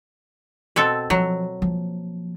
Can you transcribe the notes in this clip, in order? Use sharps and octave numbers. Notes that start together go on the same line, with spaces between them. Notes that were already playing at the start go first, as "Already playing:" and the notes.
B2 C4 A4
F3 F#3
F3 A#3